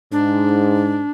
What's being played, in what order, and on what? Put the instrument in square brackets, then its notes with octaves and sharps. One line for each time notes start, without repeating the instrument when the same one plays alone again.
[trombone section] G#2 [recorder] D4